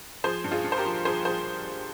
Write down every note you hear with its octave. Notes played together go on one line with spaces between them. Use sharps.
F3 G#4 C5
G2
F4 G#4
G2
C5
G4 A#4
F3
F3 G#4 C5
F3 G#4 C5